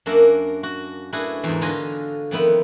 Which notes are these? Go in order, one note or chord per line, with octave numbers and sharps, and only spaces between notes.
F#2 A#3 D4 F#4 A#4 E5
F#4
A3 D4 E4 F#4 G#4 B4
E2 G#2
D3 F4 F#4 D#5 G#5
F2 D#3 B3 E5 B5